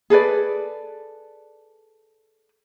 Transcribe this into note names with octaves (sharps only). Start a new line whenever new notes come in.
G#4 A4 B4 D5